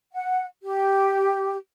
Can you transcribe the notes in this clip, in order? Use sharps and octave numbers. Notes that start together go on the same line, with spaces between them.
F#5
G4